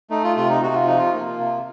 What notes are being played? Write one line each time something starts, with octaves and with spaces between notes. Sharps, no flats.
A3 D#4
F4
C3 F4
D#4
C3 F#4
F4
F3 D#4
F4
A#3
C3